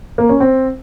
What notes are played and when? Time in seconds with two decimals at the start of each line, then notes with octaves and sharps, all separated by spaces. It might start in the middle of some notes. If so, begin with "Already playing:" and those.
0.18 A#3
0.29 C#4
0.40 C4